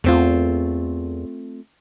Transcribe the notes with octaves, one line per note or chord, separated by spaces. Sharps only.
E2 A3 C4 F4